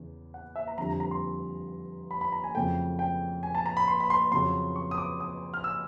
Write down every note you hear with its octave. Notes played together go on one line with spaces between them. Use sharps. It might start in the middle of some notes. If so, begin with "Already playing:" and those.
Already playing: E2 C#3
F#5
E5
A#5
F2 D3 G3 A#5
A#5
A#5
C6
B5
B5
A#5
G#5
F2 C#3 F#3 A3 G5
G5
G#5
A5
A#5
B5
C6
B5
C6
F2 C#3 F#3 C6
C#6
D#6
D6
D#6
F6
E6